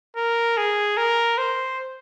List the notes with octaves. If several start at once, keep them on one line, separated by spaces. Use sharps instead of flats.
A#4
G#4
A#4
C5